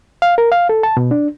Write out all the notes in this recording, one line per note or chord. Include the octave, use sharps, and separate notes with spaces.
F5
A#4
F5
A4
A5
B2
D4